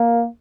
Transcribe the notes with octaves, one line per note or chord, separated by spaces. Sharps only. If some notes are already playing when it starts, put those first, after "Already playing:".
Already playing: A#3